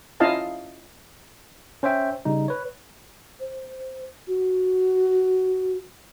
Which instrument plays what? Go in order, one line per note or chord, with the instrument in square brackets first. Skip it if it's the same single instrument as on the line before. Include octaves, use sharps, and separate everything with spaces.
[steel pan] C#4 E4 F4 D#5 F5 A5
[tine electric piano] C#4 C5 C#5 E5 G5
C#3 G3 D#4
B4 C#5
[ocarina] C5
F#4